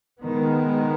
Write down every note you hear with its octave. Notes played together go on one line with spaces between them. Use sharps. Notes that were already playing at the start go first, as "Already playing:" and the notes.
D#3 G#3 B3